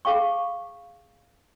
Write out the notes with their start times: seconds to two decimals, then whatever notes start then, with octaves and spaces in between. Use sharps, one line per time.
0.05 G#4 F5 G5 C#6